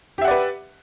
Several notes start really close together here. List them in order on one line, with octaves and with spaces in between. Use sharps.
G4 E5 F#5 D5 B4